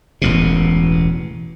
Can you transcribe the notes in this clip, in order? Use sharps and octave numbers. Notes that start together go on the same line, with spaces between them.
E1 A1 B2